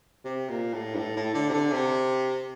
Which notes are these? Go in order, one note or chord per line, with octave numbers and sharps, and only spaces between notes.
C3
A#2
A2
G2
A2
A2
D3
C3
D3
C3